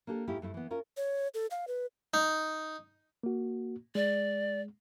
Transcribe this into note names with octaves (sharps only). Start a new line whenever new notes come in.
A#3 D4 G4 A4
G#2 A3 E4 F4 G4
G2 A3 E4
E3 B3
C#4 F4 A#4
C#5
A4
F5
B4
D#4
A#3 F#4
G#3 D5